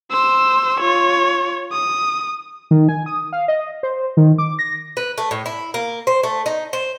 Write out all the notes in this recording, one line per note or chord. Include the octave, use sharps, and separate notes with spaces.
C5 E6
F4 C#5
D#6
D#3
G#5
D#6
F5
D#5
C5
D#3
D6
A#6
B4
A3
A2
E4
A#3
C5
A3
D#4
C5